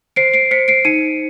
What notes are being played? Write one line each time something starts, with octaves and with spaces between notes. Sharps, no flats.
C5 C7 D7
C7 D7
C5 B6 C#7
C7 D7
D#4 C#7 D#7